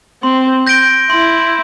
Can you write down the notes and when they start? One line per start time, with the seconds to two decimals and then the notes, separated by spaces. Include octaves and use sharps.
0.23 C4 C6
0.67 G6 A#6 D7 G7
1.10 E4 C6